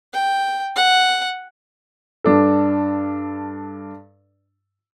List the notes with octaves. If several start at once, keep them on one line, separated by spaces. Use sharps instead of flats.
G5
F#5
G2 D4 A4